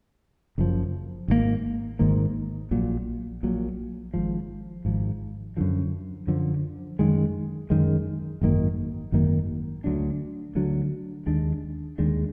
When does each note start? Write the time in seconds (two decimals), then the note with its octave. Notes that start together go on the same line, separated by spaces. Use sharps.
0.58 F#1 F#2 F3
1.28 G#1 G#2 D#3 A#3
1.99 G#1 G#2 D#3 A#3
2.71 A#1 A#2 F#3
3.43 A#1 A#2 F#3
4.14 G#1 G#2 F3
4.85 G#1 G#2 F3
5.57 F#2 D3 F3
6.27 F#2 D3 F3
6.99 F#2 D#3 G#3
7.70 F#2 D#3 G#3
8.41 G#1 F#2 D#3 A#3
9.12 G#1 F#2 D#3 A#3
9.84 D2 D3 F#3 D4
10.55 D2 D3 F#3 D4
11.26 D#2 D#3 G#3 D4
11.98 D#2 D#3 G#3 D4